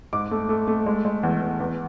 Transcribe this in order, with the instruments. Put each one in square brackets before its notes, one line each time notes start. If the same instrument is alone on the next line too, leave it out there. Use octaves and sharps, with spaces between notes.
[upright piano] G#2 D6
A3
A3
A3
G#3
G#3
E2
E2
E2